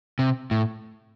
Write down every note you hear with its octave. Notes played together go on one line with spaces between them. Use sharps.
C3
A2